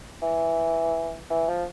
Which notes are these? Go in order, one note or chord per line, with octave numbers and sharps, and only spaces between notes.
E3
E3
F3